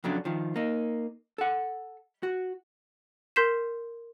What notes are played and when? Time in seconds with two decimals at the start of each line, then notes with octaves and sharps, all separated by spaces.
0.04 F2 C#3 F#3 D4
0.25 D#3 F3
0.56 A#3 D#4
1.38 A4 F#5
2.23 F#4
3.36 A#4 C6 G6 B6 C7 E7